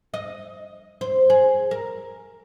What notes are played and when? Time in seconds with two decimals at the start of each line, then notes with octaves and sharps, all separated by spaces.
0.14 D#5
1.01 C5
1.30 G#4
1.71 A#4